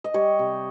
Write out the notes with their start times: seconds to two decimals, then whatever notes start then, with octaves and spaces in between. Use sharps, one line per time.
0.04 D#5
0.14 G3 C#5
0.39 C3